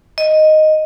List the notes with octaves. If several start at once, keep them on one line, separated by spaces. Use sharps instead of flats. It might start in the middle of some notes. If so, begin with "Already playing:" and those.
D#5